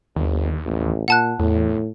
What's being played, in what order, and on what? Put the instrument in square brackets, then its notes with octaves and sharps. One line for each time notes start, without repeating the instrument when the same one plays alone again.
[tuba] G1 [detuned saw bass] D#2
[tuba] A1
[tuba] A#2 [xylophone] F#5 A5 F#6
[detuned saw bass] E2 [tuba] A2